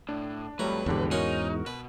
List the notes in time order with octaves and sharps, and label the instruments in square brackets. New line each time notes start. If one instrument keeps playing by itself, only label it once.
[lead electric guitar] A2 [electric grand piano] D4
[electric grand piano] F2 G3 A3 [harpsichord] F#3 A#5 [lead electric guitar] B4
[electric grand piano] A#1 D3 G4 [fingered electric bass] E2 G#2
[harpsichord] C#4 F#5 C6 [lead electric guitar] D#4 [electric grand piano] F#4 A#4
[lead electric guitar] B2 [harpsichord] B4